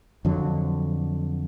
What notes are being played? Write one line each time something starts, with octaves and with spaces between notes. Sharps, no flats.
F2 D3 F#3